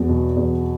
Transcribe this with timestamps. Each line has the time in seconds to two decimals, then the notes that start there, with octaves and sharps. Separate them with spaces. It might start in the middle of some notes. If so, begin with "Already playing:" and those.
Already playing: E2 F#3
0.09 B2
0.36 E2